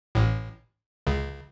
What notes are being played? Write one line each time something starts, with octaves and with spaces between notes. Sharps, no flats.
A1 A2
C#2 C#3